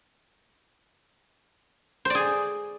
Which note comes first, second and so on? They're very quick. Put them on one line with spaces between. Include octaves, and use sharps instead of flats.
C5 D5 G#4